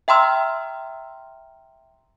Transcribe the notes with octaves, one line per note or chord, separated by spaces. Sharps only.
E5 G5 A#5 C6 E6 F6